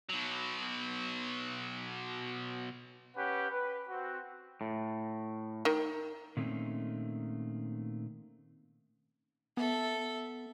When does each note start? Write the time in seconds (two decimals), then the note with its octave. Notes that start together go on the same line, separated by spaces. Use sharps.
0.09 B2 F#3
3.17 C#4 G4 B4 F#5
3.51 B4
3.89 C4 F#4
4.61 A2
5.65 D#3
6.37 A#2 D#3 A3 C4 C#4
9.57 B3 A4 E5